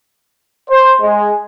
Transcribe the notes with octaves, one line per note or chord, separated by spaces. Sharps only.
C5
G#3